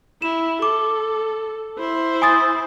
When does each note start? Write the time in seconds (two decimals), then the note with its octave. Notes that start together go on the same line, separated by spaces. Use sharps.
0.22 E4 E7
0.62 A4 D6
1.79 E4 C5
2.22 G#5 D#6 A6